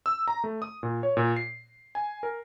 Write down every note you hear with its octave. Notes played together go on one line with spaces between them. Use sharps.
E6
A#5
A3
D#6
A#2
C#5
A#2
C7
G#5
A#4